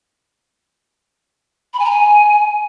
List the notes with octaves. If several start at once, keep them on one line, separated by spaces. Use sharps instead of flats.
B5
G#5
A#5
G#5